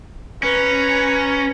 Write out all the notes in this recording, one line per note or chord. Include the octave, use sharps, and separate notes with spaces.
C#4 B4 A#5